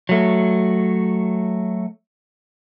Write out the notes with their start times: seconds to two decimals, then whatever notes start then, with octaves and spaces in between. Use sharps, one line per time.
0.09 F#3 A3